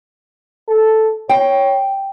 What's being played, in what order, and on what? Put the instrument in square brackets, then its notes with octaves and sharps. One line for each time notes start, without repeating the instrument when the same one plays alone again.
[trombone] A4
[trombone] C#5 [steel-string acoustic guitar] G5